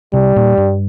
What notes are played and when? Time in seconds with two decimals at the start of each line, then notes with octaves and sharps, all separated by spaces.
0.13 C3 G3
0.36 A#2
0.58 G2